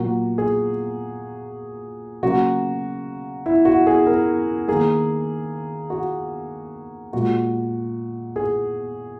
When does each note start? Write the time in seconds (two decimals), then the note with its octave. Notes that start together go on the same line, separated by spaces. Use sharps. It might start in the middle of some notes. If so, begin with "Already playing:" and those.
Already playing: A#2 F#3 A#3 F#4
0.38 G#4
2.23 C#3 F#3 A#3 F#4
3.46 E4
3.65 F#4
3.87 G#4
4.06 A#4
4.68 D#3 A#3 G#4
5.90 F#4
7.13 A#2 G#3 F#4
8.36 G#4